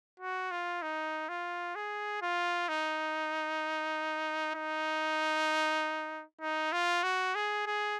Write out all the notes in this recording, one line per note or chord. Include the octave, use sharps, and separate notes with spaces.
F#4
F4
D#4
F4
G#4
F4
D#4
D#4
D#4
F4
F#4
G#4
G#4